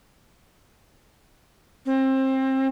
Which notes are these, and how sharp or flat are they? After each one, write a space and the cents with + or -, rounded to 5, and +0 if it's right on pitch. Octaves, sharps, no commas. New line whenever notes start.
C4 +25